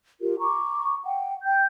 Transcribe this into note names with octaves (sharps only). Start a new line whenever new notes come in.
F4 G4 A#4
A#5 C#6 D6
F#5 G5
G5 G6